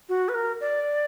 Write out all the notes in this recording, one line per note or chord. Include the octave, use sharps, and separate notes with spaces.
F#4
B4
A#4
D5